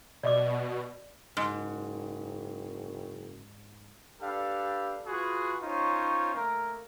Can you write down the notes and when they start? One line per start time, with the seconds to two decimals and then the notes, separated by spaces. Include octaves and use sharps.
0.23 B2 D5 D#5 D6
1.37 F#1 G#2
4.21 D4 G4 A4 B4 F5
5.06 F4 F#4 G#4 B4
5.62 C#4 D#4 F4 C5 C#5
6.35 A3 A#3 A#4